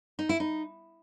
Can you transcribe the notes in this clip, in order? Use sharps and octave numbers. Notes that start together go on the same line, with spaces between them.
D#4
E4
D#4